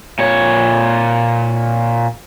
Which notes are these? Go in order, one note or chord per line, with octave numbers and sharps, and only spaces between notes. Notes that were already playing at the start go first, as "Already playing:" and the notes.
A#2 C#5